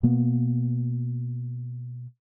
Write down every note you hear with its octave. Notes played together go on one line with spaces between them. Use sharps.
B2 A#3 B3